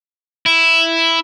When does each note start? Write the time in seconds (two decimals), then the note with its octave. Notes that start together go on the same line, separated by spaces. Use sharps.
0.46 E4